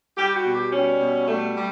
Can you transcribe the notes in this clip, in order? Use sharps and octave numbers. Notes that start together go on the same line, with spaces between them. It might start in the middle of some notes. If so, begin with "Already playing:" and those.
G3 G4
F#4
B2
G4
G3 C#4
B2
G3 A3
G3